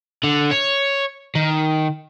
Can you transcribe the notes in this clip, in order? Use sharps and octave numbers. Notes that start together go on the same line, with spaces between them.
D3
C#5
D#3